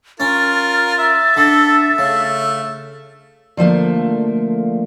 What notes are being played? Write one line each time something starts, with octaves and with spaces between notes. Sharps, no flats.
C#4 F4 A#4 A6
E5
D3 A4
C#3 A3
D3 F3 A3 A#3